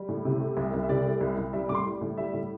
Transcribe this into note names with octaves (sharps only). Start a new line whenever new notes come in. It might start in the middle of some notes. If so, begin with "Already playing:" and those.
Already playing: G3
A2
C3
A3
C2
C2
E5
C3 D5
A3
C2
C2
G3 E5
A2 D6
C6
G3
A2
G3 E5
A2